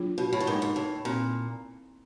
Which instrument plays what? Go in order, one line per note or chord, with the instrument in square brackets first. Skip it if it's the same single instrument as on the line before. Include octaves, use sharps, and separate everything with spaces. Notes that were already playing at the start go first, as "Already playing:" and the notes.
Already playing: [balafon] F#3 A#3 D4 F4 G#4
[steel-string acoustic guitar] B2
A2
G2
[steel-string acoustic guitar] G#2 [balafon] A#3 D#4 G4 A#4
[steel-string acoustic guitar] G#2
A2
[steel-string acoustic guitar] A#2 [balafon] C4